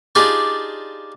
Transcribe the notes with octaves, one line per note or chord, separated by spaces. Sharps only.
D4 D#4 F4 G4 G#4 D5